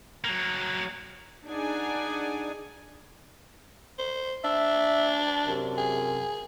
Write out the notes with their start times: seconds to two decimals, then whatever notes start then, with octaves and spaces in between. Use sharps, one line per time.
0.24 F#3 A#3
1.47 D4 D#4 G#4 D5 F#5 G#5
3.99 C5
4.44 D4 E5
5.47 F#2 C3
5.78 G#4